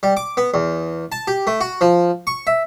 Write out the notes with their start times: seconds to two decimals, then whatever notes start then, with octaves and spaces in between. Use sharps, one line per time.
0.03 G3
0.17 D6
0.37 B3
0.54 E2
1.12 A5
1.28 G4
1.47 A3
1.61 F#4
1.81 F3
2.27 C#6
2.47 E5